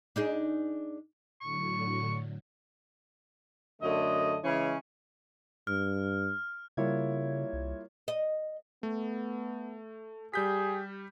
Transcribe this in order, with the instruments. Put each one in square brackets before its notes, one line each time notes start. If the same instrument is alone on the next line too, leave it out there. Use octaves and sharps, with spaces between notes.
[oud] D4 D#4 G#4
[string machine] A2 D3 F#3 [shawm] C#6
[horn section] F#2 D3 A3 D#5
C#3 E3 G#3 C#4
[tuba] G2 [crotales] F6
[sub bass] C#3 [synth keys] G3 C#5 G#6 [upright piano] A#3 E4 F4
[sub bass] C2
[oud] D#5
[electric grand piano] A3 [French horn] B3
[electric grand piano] G3 G6 B6 [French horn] G4 [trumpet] G#4